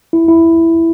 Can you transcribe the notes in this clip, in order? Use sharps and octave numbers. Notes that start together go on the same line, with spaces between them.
E4
E4